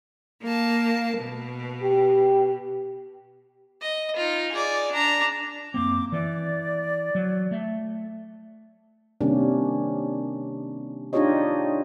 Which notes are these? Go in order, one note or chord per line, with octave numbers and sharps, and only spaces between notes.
A#3 A5
B2
G4
D#5
D#4 F4
G#4 D5
D4 A#5
F#2 A#3 C4 D6
E3 D5
F#3
A3
C3 D#3 G3 A#3 C#4 D4
D4 D#4 F4 G4 C#5 D#5